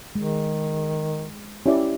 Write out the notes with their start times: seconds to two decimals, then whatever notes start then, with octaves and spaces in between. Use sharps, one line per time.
0.15 D#3 G#3
1.66 C#4 E4 G4 D5